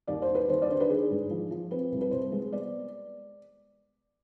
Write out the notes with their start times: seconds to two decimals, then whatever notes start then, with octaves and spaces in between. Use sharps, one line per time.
0.07 D#2 D5
0.22 C5
0.29 D#2
0.35 B4
0.49 D#2 C5
0.62 D5
0.69 D3 C5
0.80 B4
0.89 D#3 G#4
1.10 G#2
1.30 F3
1.51 F3
1.71 C4 B4
1.91 C2
2.01 B4
2.11 C2 C5
2.32 G#3
2.53 B3 D5